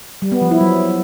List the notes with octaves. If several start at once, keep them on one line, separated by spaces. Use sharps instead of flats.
G3
B3
F3
E4
F#3